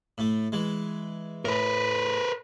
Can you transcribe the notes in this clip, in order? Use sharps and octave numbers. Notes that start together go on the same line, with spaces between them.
A2 A3
E3 G#3
A2 A#4 B4